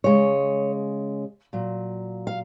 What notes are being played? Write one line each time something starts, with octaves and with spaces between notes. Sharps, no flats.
C#3 G#3 C#5
A#2 F#3
F5